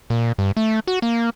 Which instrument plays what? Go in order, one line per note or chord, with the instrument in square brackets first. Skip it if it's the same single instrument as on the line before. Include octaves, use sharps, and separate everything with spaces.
[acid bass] A#2
G2
A3
F#4
A#3